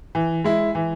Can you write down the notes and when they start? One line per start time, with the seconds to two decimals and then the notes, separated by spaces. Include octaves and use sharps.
0.15 E3
0.44 G#3 E4
0.75 E3